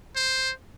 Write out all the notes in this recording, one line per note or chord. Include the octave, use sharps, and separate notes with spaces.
C5